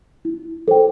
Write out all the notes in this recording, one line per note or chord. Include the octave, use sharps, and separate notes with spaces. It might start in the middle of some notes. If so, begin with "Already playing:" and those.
E4
A4 C5 G5